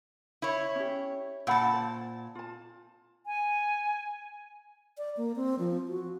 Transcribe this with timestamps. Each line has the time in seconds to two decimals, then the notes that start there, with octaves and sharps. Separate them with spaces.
0.42 E4 C#5
0.75 C#4 G4
1.47 A#2 C#4 F#5 A5 B5
1.74 C5
2.35 F4 A5
3.26 G#5
4.98 D5
5.17 A#3
5.36 C4
5.59 F3
5.88 F#4